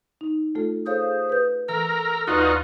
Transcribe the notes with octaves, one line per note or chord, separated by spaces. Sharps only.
D#4
A3 F4 A4
G#4 A4 C5 C#5 F5
B4 G6
E3 A4 A#4 E6
D#2 D#4 F4 F#4 B4 D5 F6